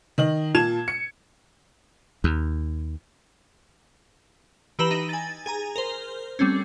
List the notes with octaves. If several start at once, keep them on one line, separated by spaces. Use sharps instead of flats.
D#3 D#5 F#7
A#2 F4 A5 G#6 E7
C#7
D#2
E3 G4 B4 A#5 E7 F#7
D#4
G#5 A6
G#4 G#5 A#5
A#4 C5
G3 A3 C4 C#4